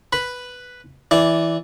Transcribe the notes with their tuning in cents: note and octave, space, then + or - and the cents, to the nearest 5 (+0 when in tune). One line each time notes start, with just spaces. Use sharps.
B4 +0 B5 +0
E3 +0 D5 -10